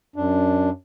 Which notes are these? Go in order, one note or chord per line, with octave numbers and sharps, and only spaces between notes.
F#2 D4